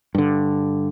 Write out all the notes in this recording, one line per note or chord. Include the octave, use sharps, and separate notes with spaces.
G2 D3